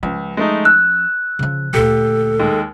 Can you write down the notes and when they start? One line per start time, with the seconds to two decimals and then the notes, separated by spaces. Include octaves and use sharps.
0.03 C#2 F3 C#4
0.37 G#3 A3 D#4
0.65 E6 F#6
1.39 C#3 F3
1.74 D2 A#2 G4 A4
2.39 D#2 G#3